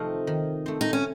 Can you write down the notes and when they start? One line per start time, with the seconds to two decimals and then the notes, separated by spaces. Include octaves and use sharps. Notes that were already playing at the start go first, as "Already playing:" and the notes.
Already playing: C3 F3 A3 C4 D#4 F4
0.27 D#3
0.66 A3 C4
0.81 D#4
0.93 C#4